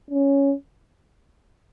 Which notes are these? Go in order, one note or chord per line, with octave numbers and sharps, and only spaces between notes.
C#4